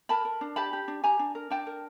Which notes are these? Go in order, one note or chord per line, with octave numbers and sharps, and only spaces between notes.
A#4 A5 B5
A#4
D4
G4 A5 B5
G4
D4
G4 G#5 A#5
D4
A#4
D4 G5 A5
A#4